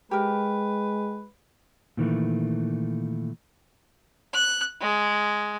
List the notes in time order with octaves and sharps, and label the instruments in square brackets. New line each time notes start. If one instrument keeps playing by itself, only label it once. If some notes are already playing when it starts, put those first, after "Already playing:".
[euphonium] G#3 [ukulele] G4 A#4 [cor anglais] B4
[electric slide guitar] A#2 D#3 E3 A3
[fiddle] F#6
G#3